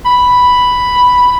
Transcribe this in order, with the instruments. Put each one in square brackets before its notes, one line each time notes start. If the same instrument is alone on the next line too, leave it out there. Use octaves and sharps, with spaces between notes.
[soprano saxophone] B5